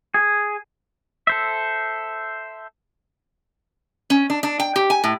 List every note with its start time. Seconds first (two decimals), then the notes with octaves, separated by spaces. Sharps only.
0.14 G#4
1.27 A4 C5 E5
4.10 C#4
4.30 D4
4.43 D4
4.60 G5
4.76 G4
4.90 G#5
5.04 A2